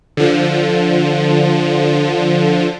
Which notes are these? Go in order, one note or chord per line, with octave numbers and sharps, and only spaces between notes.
D3 F3